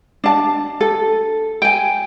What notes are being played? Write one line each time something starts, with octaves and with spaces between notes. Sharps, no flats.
D4 A5
A4
G5 G#5